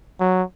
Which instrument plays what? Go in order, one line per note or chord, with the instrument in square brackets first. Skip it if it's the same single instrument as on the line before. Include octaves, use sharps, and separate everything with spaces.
[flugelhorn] F#3